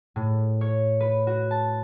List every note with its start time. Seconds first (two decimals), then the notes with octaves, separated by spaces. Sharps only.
0.16 A2
0.61 C#5
1.00 B4
1.27 F#4
1.51 A5